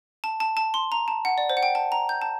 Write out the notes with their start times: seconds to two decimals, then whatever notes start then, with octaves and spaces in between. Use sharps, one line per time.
0.24 A5
0.40 A5
0.57 A5
0.74 C6
0.92 A#5
1.08 A5
1.25 F#5
1.38 D5
1.50 C5
1.57 F#5
1.63 G5
1.75 A5
1.92 A#5
2.09 G6
2.22 A5